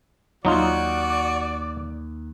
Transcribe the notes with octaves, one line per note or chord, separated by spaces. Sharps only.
D#2 F#3 D#4 F4 F#4 D5